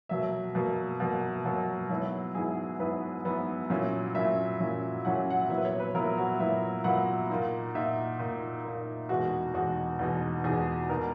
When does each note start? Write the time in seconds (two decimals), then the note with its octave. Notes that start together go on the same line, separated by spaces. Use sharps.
0.09 B2 F#3 A#3 E5
0.55 B2 F#3 A#3
1.00 B2 F#3 A#3
1.45 B2 F#3 A#3
1.89 G#2 F#3 B3 E4 C#5
2.35 G#2 F#3 B3 E4 G#4
2.79 G#2 F#3 B3 E4 B4
3.25 G#2 F#3 B3 E4
3.70 A#2 F#3 C#4 E4
4.15 A#2 F#3 C#4 E4 E5
4.60 A#2 F#3 C#4 E4
5.05 A#2 F#3 C#4 E4 F#5
5.30 F#5
5.49 A#2 F#3 B3 E4 E5
5.58 B4
5.65 C#5
5.80 B4
5.94 A#2 F#3 B3 E4 A#4
6.17 F#4
6.40 A#2 F#3 B3 E4 E5
6.84 A#2 F#3 B3 E4 F#5
7.30 A#2 A#3 D#4
7.74 A#2 A#3 D#4 E5
8.19 A#2 A#3 D#4
8.65 A#2 A#3 D#4
9.09 E2 B2 G#3 D#4 F#4
9.54 E2 B2 G#3 D#4 F#4
9.99 E2 B2 G#3 D#4
10.44 E2 B2 G#3 D#4 G#4
10.90 B2 G#3 B3 D#4 A#4